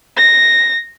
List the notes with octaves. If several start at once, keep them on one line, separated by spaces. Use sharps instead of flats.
A#6